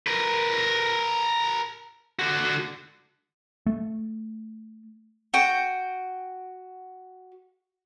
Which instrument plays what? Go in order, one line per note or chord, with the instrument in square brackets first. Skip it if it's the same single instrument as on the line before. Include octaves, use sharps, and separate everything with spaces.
[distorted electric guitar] A#4 B4
D3 F#4
[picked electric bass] A3
[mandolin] F#4 G5